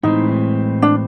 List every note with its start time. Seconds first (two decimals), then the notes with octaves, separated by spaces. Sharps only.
0.03 A2 E3 G#3 C4 D#4
0.82 D4